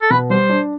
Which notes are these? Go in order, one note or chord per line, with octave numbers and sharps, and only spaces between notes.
A4
B2 B4
G3 C5
D4